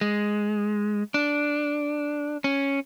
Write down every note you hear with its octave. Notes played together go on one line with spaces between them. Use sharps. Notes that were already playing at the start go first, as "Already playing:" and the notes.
G#3
D4
C#4